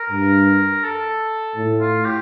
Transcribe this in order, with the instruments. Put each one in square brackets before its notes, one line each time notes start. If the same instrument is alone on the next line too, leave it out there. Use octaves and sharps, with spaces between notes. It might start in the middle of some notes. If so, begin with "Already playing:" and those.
Already playing: [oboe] A#4
[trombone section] G2
[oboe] A4
[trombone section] A2
[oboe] F4
G4